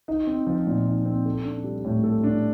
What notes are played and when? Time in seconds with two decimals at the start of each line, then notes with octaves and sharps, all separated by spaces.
0.08 D#4
0.27 C4
0.47 F3
0.67 A#2
0.86 D#4
1.05 C4
1.26 A4
1.44 D4
1.64 G3
1.84 A2
2.04 A4
2.24 D4